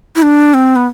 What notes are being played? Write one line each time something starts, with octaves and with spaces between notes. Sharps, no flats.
E4
D4
C4
B3